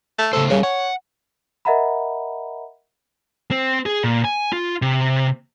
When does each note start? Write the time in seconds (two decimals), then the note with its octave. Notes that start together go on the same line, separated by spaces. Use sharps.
0.18 A3
0.33 C#3 A3 A4 C5
0.50 C#3 G3 A#4
0.63 C#5 F#5
1.65 A#4 D#5 E5 F#5 A#5 B5
3.51 C4
3.86 G#4
4.04 A#2
4.24 G#5
4.53 F4
4.82 C3